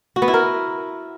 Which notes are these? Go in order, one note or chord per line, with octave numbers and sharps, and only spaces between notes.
F#4
B3
E4
A#4